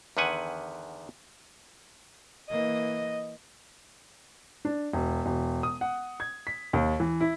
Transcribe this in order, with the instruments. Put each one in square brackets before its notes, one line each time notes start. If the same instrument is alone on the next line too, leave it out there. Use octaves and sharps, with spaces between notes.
[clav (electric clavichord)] E2 D3 D#3 B4 F#5 G#5
[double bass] E3 A#3 [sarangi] D#5
[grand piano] D4
E1
E1
D#6
F#5
G#6
B6
D#2
E3
E4